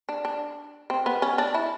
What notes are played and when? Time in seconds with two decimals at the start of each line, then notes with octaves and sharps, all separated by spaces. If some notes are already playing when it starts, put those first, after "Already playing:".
0.09 D4
0.25 D4
0.90 C4
1.06 B3
1.22 C#4
1.38 D4
1.54 E4